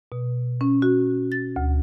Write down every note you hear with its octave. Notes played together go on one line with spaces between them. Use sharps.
B2
C#4
F#4
A6
D2